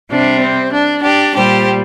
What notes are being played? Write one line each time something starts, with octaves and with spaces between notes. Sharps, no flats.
C3 G3 D4
C4
D4
D4 G4
A#2 G3 G4 C5